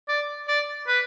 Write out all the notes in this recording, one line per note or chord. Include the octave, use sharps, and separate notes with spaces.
D5
D5
B4